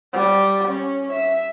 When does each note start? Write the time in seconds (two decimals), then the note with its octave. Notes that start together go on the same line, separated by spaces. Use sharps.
0.14 G3
0.68 C#4
1.12 E5